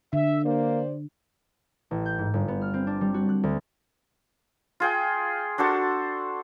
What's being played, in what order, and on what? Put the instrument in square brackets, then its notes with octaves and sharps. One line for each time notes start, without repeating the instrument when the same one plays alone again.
[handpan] D3 [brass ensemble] E5
[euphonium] A#3 [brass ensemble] G4 C5 D5
[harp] A1
G6
G#2
G1
B3
F6
C4
D4
G3
F#4
F#6
D2
[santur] F4 G#4 G5
D4 F#4 A4 C5